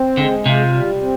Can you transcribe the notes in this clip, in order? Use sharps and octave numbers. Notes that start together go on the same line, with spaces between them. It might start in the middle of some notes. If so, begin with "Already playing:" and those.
Already playing: C4
D3 G#3
C3 F4
G3
C4